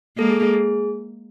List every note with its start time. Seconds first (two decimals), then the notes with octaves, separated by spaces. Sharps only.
0.18 G#3 A#3 A4
0.30 G#4
0.42 G#4
0.54 G#4